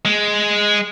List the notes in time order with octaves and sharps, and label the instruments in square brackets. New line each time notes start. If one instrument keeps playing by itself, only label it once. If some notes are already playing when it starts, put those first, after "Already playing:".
[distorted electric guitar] G#3